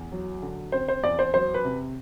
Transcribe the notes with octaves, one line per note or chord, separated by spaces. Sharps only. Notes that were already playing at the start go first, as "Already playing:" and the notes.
Already playing: E2
F#3
D3
C4 C5
C5
E2 D5
C5
F#3 C5
B4
C3